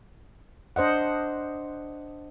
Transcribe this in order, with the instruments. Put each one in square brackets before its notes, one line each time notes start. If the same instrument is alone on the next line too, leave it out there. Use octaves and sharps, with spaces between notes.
[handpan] D4 C5 D#5 F#5